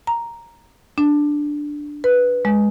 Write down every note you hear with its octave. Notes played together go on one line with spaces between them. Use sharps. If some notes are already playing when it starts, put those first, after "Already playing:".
A#5
D4
B4
G#3